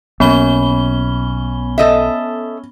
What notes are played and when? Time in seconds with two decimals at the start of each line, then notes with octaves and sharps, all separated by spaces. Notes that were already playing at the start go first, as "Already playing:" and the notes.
0.20 B1 B2 A#3 B3 C#4 B5 G7
1.78 A4 D#5 E5